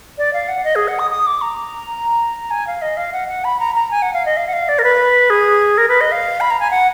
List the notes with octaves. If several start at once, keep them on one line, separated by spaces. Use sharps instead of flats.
D5
F5
F#5
D#5
G#4
F#5
D#6
D#6
D6
A#5
G#5
F5
D#5
F5
F#5
F#5
B5
A#5
A#5
G#5
F#5
F5
D#5
F5
F#5
F5
D5
A#4
B4
G#4
A#4
B4
D#5
F5
B5
A#5
G#5
F#5